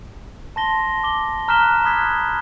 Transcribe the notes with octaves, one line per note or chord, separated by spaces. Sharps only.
A5 C6 A#6 G7
D6 G7
A#5 F6 F#6 B6 E7 G7
B5 D6 D#6 F#6 G#6 B6